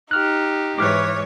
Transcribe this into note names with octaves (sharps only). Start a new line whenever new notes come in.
D#4 G4 F6 F#6
G#2 E3 C#5 D6 F6 F#6